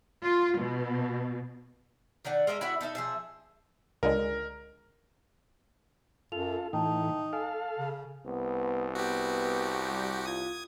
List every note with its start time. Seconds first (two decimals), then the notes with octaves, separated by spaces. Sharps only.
0.24 F4
0.59 B2
2.25 D#3 A3 D4 F#5
2.47 G#3 A#4 D#5 E5
2.61 E4 F#4 E5 F#5
2.81 D#4 A4 A#4 E5
2.95 F3 G#4 E5
4.03 C#2 D3 G#3 A#4
6.32 F#2 F4 A4 F7
6.73 A2 E3 D#4 G5 A5
7.33 A4 F5 G#5
7.78 C#3
8.26 C2 B3
8.95 B3 F#4 G4
9.89 G3
10.26 F4 D#6 G#6